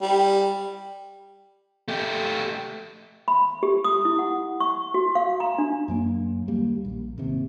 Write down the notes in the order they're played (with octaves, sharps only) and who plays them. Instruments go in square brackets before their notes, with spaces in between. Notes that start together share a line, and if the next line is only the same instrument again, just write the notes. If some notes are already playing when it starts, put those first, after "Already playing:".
[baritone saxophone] G3
[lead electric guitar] A3 G4
[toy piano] B5
G4
D#6
E4
F#5
C#6
F#4
F5
A#5
D4
[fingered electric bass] F#2 F#3 A#3
D#2 G3 A#3
A#1
G#1 D#2 C3